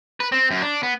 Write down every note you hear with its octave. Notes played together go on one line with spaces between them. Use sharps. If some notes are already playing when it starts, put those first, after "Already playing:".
B4
C4
F#2
D4
B3